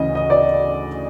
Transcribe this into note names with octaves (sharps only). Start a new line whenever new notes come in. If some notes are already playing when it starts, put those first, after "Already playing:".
Already playing: D2 C#3 E3 D#5
D#5
D5